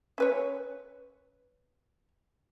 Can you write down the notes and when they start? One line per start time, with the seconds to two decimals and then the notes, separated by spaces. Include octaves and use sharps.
0.18 C#4 B4 C#5